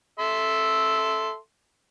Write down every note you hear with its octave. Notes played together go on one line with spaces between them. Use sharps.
A4 E5 C6